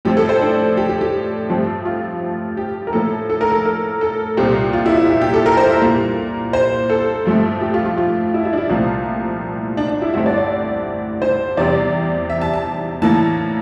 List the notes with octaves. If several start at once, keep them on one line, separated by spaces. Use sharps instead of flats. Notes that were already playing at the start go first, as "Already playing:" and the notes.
A2 F3 C4 G4
A4
C5
D4
G4
G4
G4
G2 F3 A3 C4
F4
G4
A#4
A2 F3 A#3 A4
A4
A#4
A4
A#4
A4
C2 A#2 G3 C4 G4
F4
E4
E4
G4
G4
A4
A#4
C5
E5
A#2 G3 A#3
C5
A4
G2 F3 A3 C4
G4
F4
F4
F4
E4
E4
D4
E4
C2 A#2 F3 A3 C4 F4
D4
D4
E4
G2 D3 A3 C4 E4
D5
D5
C5
E2 C3 G3 C4 D5
E5
A5
A5
A2 E3 A#3 A5